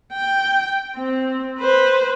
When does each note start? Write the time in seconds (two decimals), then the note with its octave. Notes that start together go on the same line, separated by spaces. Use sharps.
0.13 G5
0.98 C4
1.59 B4 C5